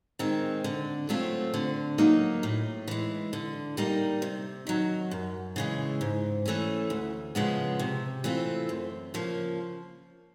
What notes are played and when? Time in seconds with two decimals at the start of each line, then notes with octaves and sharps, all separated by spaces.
0.19 D#3 G#3 C4
0.64 D3
1.09 F#3 A3 C4 F4
1.54 D3
1.98 F#3 A#3 D#4
2.43 A2
2.88 E3 G#3
3.33 D3
3.77 G3 A#3 D#4
4.22 C3
4.67 D#3 F#3
5.11 F#2
5.56 C#3 E3 G#3
6.01 G#2
6.46 E3 A3 C#4
6.90 D2
7.35 C#3 F3 G#3 B3
7.79 C3
8.24 E3 A3 C4 F4
8.69 F#2
9.14 C#3 F3 A#3